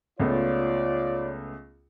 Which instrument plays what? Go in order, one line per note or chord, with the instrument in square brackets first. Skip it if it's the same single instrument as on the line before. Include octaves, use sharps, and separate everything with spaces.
[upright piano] C#2 A3 B3 [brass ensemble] F4 C#5 D5